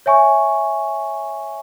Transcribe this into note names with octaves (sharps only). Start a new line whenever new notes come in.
C#5 E5 G#5 C#6